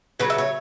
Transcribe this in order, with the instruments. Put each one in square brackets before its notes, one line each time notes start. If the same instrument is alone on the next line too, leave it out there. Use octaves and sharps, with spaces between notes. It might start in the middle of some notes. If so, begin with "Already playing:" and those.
[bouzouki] C#3 F#3 B4
E5
C#5